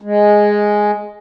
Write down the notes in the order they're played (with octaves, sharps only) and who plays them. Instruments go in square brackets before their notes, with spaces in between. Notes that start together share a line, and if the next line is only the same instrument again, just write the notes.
[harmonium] G#3